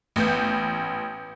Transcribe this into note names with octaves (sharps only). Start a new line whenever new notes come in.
A1 B3 G6